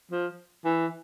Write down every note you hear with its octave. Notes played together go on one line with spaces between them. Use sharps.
F3
E3